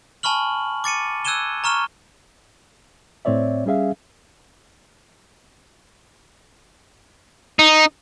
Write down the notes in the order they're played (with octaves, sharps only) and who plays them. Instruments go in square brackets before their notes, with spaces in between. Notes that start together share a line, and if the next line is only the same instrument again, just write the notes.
[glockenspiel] G#5 A5 B5 C#6 F6 F#7
D6 A6 C#7 D#7
E6 F#6 G#6 D#7 E7 G7
A#5 C#6 F6 E7 G7
[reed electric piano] A2 C4 C#5 D5 E5
G3 C#4 G#4 E5 F5
[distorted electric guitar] D#4